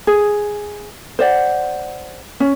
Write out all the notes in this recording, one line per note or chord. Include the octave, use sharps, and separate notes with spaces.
G#4
C5 D5 F#5
C#4